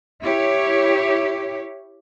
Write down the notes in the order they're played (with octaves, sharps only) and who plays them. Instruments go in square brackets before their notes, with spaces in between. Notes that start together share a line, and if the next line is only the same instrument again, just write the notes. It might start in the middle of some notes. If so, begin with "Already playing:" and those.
[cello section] E4 G4 C#5